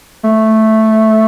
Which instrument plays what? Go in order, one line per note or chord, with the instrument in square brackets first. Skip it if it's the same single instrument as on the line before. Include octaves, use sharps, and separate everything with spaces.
[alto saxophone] A3